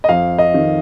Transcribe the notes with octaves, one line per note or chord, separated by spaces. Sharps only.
D#5
F2 F5
D#5
D#3